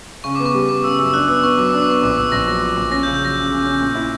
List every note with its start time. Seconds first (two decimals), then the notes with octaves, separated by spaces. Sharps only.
0.24 C#3 C#6
0.35 B3 D6
0.46 C#6
0.54 G3
0.69 B3 D6
0.84 C#3 E6
0.98 F#2 E6
1.14 D4 F#6
1.28 B3 E6
1.43 B3 C#6
1.57 F#3 D6
1.69 D4 E6
1.81 D6
1.88 B3 C#6
2.03 A#1 D6
2.18 A#1 E6
2.32 A#1 A#6
2.47 F#3 A#6
2.62 A#2
2.77 A#1
2.91 C#4 A#6
3.03 G6
3.06 C#3
3.14 G6
3.21 F#3 A#6
3.36 C#3
3.51 C#3
3.66 C#4
3.81 A#2
3.95 E4